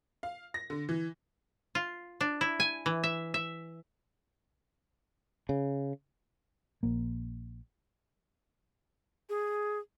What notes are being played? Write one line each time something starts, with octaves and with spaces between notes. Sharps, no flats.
F5
A#6
D3
E3
F4
D4
E4
G#5
E3
E5
E5
C#3
A#1 A#3
G#4